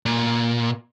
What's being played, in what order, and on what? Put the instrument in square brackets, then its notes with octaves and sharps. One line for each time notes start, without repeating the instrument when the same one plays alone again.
[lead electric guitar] A#2